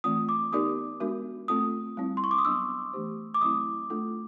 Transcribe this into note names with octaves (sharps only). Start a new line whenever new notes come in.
E3 A3 C4 F4 D#6
D6
B3 D#4 G4 A#4 D5 D#6
G#3 B3 D4 F#4 A#4
A3 C4 F4 A4 D#6
G3 C4 E4
C6
C#6
D6
D#6
F#3 B3 D4 E6
E3 A3 D4 G4 C5
D6
F#3 A3 C4 E4 D#6
A3 D4 F4 A4